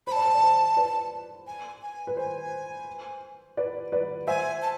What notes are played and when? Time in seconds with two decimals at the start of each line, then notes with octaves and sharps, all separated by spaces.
0.07 C5 B5
0.12 D5 A5
0.26 C5
0.35 D5
0.43 C5
0.77 B4 D5
1.47 G#5
1.82 G#5
2.07 B4
2.17 C5 G#5
3.57 B4 D5
3.92 B4 D5
4.27 C5 E5 G#5
4.62 A5